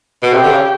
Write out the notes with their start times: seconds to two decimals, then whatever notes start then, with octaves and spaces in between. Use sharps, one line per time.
0.23 B2
0.33 C3 G4
0.43 D3
0.51 C#3